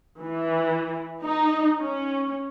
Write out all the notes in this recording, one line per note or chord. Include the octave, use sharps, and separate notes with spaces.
E3
D#4
C#4